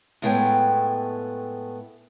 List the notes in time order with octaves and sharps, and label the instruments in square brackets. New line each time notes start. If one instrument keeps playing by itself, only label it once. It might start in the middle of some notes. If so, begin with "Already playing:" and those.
[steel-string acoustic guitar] A2 G#3 A3 B3 G#4 G5